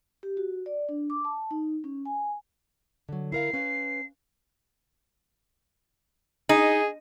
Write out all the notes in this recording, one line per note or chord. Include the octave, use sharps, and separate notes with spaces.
G4
F#4
D5
D4
D6
A5
D#4
C#4
G#5
D3 F#3
E4 A#4 F5 C7
C#4 B4 F5
D#4 G#4